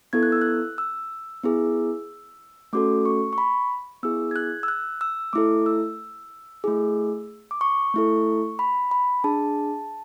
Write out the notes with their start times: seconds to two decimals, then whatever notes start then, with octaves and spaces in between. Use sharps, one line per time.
0.13 B3 E4 A4 G#6
0.23 F#6
0.32 E6
0.41 F#6
0.78 E6
1.43 B3 E4 G#4
2.73 A3 C#4 F#4 A4 D6
3.05 C#6
3.33 C#6
3.38 B5
4.03 B3 E4 G#4 E6
4.31 G#6
4.36 F#6
4.63 E6
4.68 F#6
5.01 E6
5.33 A3 E4 A4 D6
5.66 E6
6.64 A3 E4 G#4
7.51 D6
7.61 C#6
7.94 A3 E4 A4
8.59 B5
8.91 B5
9.24 D4 G#4 A5